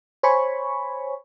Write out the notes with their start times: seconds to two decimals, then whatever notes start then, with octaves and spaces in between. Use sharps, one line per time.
0.23 C5 C#5 G#5 B5 C#6